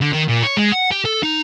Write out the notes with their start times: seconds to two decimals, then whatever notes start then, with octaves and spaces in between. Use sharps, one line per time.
0.01 D3
0.14 D#3
0.29 A#2
0.43 C#5
0.57 G#3
0.72 F#5
0.92 G4
1.05 A4
1.23 D#4